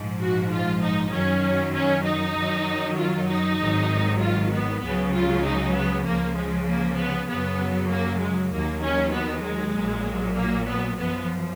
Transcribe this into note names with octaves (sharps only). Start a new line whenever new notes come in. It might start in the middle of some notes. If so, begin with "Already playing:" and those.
Already playing: A#1 G#2 F3
F#4
F4
D#4
F#2 D#3 F#3 C#4
C#4
D#4
F#2 D#3 F#3
F4
D#4
G#1 G#2 D#3 F#3
F4
B3
C#2 C#3 F#3 B3
F4
D#4
B3
C#2 C#3 F3 A#3
G#3
A#3
B3
F#2 C#3 F#3 B3
A#3
G#3
D#2 D#3 F#3 A#3
C#4
B3
G#3
A#1 A#2 F#3
A#3
B3
F#2 F3 B3